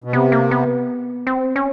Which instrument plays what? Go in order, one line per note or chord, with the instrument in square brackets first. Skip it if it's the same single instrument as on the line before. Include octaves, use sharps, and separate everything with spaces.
[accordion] B2
[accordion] C3 [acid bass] B3
[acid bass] A#3
B3
C4
C#4